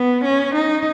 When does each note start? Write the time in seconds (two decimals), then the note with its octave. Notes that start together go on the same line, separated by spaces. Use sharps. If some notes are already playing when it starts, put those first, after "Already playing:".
Already playing: B3
0.25 C#4
0.55 D#4